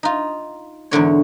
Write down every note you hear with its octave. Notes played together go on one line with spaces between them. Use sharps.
D#4 F4
E2 G#2 D3 C#5